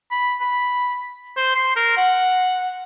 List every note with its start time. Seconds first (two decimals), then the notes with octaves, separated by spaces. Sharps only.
0.11 B5
0.41 B5
1.37 C5
1.55 C6
1.76 A#4
1.97 F#5